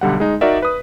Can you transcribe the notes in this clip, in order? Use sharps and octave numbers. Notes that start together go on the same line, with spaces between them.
B1 D3 G3 F#5
G#3 D#4
D#4 F#4 A#4 D5 E5
B4 D#6